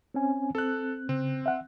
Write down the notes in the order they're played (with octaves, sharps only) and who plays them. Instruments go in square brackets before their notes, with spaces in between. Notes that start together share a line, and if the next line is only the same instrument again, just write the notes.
[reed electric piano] C4 C#4 G#5
[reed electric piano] C4 [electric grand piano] A4 F#6
[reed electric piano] C#3 [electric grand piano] C4
[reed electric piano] E5 F#5